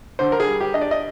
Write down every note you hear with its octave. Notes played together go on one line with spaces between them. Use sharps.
D3 C5
A#4
G#4
G3
G4
D4 D#5
D5
D#5